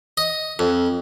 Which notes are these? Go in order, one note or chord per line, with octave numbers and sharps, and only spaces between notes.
D#5
F2